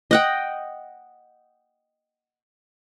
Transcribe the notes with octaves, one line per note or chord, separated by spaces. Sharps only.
D#5 F#5 G5